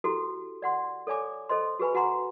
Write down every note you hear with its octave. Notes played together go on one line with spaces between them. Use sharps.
E4 F#4 G4 A4 C6
D5 F#5 C6
A4 C#5 D5 G#5 D6
A4 C5 D#5 C6
F#4 G#4 B4 G#5 B5
F#4 F#5 G#5 A#5 C6